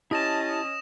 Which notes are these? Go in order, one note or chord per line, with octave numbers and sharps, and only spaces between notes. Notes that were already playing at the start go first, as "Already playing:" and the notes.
C#4 E4 G4 D#5 A5 D#6 A#6 E7